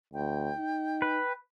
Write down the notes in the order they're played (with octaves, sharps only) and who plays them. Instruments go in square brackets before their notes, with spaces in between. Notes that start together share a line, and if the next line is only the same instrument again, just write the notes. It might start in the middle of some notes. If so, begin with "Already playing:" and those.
[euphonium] D2 [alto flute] G5
[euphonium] D#4
[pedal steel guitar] B4